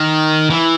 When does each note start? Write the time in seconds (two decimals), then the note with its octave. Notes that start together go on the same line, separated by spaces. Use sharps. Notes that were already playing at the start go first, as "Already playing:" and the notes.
Already playing: D#3
0.50 E3